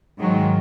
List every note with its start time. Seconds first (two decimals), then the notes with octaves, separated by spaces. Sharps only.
0.19 G#2 D#3 F#3 G#3